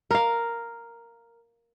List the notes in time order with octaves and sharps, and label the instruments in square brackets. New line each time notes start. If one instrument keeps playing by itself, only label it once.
[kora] A#4 F5